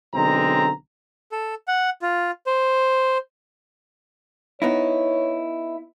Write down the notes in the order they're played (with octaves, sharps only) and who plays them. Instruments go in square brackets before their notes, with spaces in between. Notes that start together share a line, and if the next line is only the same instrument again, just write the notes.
[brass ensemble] B1 D3 G#3 C4 A#5
[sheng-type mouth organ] A4
F#5
F4
C5
[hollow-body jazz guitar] B3 D#4 E4 [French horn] C#5